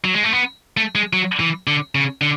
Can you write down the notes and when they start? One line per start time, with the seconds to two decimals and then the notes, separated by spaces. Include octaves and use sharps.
0.05 F#3
0.14 G#3
0.24 A3
0.33 B3
0.77 A3
0.95 G#3
1.13 F#3
1.40 E3
1.67 D3
1.95 C#3
2.21 D3